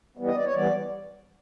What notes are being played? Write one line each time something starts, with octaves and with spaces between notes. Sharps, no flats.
E3 G3 B3
D#5
D5
C#5
E3 G3 B3 D5